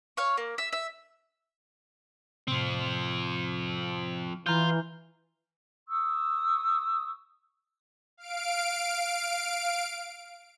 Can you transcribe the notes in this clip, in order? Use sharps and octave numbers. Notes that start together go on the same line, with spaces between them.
C#5 F5 C#6
A#3
E5
E5
A2 C3 F3 C4
E3 F4 A#5 F6 G6
C#6 D#6 E6
F5 D7